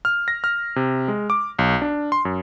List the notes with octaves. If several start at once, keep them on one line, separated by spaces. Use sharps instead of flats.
F6
A#6
F6
C3
G#3
D6
B1
D4
C6
F#2